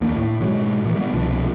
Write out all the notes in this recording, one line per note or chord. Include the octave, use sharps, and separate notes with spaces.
D#2 A#3 D4
A2
G#2 B2 F#3 G#3
A#2 D#3 E3
G3 G#3 B3
C2 B2 F3 D4